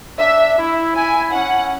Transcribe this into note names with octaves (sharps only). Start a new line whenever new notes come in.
D4 E5
E4
E4 G#5
C#4 F#5